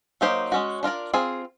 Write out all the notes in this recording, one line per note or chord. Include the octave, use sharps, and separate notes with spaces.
F#3 A#3 D#4 G4 C5
G#3 C#4 F#4
D4 F4 A#4 D5
C4 F4 G#4